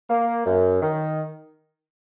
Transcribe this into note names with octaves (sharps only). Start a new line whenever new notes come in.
A#3
F#2
D#3